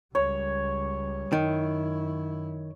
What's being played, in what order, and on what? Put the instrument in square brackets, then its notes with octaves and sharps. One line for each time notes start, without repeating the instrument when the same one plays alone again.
[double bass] C#2 G3 [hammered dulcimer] C#5
[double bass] F#2 E4 [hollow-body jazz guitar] D#3